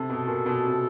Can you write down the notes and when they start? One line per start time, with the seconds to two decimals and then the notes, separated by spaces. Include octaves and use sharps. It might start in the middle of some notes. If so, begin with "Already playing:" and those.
Already playing: C3 A4
0.10 B2
0.27 A#2
0.46 B2
0.64 C3